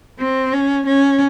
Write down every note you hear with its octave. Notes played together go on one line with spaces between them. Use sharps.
C4
C#4
C#4